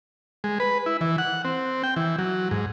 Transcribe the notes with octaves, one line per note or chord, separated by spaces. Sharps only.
G#3
B4
E4
E3
F#5
C4
G5
E3
F#3
G#2